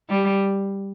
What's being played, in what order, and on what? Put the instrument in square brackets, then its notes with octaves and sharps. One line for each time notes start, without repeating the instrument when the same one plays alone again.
[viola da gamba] G3